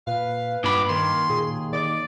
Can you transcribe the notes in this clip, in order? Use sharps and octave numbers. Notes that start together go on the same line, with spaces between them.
A#2 B4 F5
G2 A#2 B5 D6
D#2 A#4 C6
A#2 G#4
D#3 D5 D#5